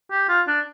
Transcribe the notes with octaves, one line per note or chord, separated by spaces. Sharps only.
G4
F4
D4